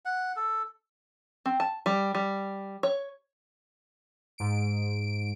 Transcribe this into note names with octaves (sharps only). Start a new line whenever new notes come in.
F#5
A4
C4
A5
G3
G3
C#5
G#2 D7